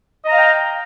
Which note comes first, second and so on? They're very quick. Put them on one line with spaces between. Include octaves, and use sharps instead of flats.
D#5 A#5 F5 G5